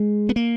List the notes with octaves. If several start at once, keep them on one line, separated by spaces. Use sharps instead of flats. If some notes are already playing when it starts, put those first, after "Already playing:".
Already playing: G#3
B3
A#3